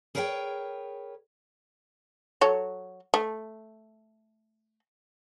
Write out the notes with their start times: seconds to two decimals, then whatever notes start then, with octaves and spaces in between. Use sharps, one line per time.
0.15 G#4 A#4 B4 C#5 F5 G5
2.41 F#3 A4 C#5
3.14 A3